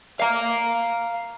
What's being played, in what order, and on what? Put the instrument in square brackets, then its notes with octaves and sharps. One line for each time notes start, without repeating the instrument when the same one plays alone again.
[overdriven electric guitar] F5 A#5